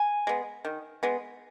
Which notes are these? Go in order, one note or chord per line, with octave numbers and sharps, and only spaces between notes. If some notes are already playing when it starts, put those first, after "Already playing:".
Already playing: G#5
G#3 B3
D#3
G#3 B3